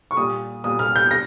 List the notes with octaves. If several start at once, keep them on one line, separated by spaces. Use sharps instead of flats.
C#6
A#2 G3 D#6
A#2 G3 D#6
F6
G6
A#6